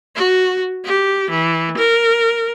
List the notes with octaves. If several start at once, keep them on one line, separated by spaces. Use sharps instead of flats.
F#4
G4
E3
A#4